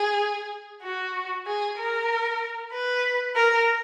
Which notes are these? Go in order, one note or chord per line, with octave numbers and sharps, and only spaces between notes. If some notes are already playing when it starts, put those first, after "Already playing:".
Already playing: G#4
F#4
G#4
A#4
B4
A#4